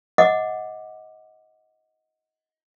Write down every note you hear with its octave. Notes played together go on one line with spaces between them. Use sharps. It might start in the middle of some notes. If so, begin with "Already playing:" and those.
D#5 F#5 D6